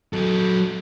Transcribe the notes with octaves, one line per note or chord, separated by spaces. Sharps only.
F#3 A4